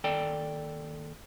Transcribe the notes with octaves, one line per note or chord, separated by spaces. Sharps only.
D#2 A4 D5 G5